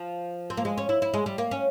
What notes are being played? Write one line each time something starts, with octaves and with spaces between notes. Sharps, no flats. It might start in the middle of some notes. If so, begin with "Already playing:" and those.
Already playing: F3
C4
A#3
G#3
C#4
E4
E4
G#3
G3
A#3
C#4